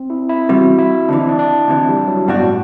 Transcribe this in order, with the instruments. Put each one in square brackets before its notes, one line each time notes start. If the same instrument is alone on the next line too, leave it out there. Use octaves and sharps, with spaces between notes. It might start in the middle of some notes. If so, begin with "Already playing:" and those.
Already playing: [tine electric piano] C4
E4
E4
[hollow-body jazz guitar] E2 C3 G3 [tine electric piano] F#4
[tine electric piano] E4
[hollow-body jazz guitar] D2 C3 E3 [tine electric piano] D4
[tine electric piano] E4
D4
D4
[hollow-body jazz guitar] D2 C3 E3
[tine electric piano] G3
F#3
[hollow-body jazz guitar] C2 B2 G3 D4 F#4 [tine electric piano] G2
[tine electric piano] A2